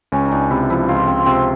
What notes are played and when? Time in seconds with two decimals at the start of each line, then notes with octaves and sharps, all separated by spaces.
0.12 C#2 C#4
0.25 D#4
0.31 C#2 D4
0.50 C3 E4
0.70 F3 E4
0.88 C#2 F4
1.07 C#2 C4
1.26 C3 C4